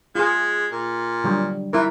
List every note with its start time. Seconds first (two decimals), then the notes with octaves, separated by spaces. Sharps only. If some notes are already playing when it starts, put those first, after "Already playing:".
0.15 G#3 F4 G#4
0.72 A#2
1.24 D3 F#3 G3
1.73 E3 E4 A#4